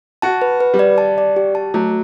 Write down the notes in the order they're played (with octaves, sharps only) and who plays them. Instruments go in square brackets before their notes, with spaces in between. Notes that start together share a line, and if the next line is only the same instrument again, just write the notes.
[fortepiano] F#4 [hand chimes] A5
[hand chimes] B4
B4
[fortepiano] G3
[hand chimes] D5
A5
D5
G4
A5
[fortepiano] F#3 [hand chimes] A3